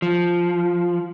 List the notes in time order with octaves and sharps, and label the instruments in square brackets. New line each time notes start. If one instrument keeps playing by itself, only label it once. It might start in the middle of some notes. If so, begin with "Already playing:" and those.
[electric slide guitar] F3